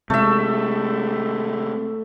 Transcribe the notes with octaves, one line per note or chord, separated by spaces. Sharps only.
C3 G#3 A3 E5